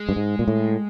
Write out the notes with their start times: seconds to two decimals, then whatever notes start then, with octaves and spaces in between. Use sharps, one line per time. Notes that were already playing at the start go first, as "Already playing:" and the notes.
Already playing: G#3
0.09 G2
0.16 G#2
0.39 A#2
0.48 A2